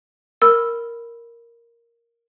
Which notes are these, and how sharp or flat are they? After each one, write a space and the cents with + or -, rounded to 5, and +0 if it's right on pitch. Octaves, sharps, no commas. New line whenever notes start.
A#4 +0 B5 +0 E6 +0